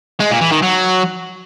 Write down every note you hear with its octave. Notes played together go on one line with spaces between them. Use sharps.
G#3
A#2
E3
D#3
F#3